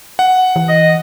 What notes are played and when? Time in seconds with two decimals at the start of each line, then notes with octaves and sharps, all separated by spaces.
0.19 F#5
0.56 E3
0.69 D#5